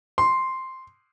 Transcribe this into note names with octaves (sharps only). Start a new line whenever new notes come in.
C6